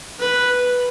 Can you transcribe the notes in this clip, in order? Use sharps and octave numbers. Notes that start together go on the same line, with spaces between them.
B4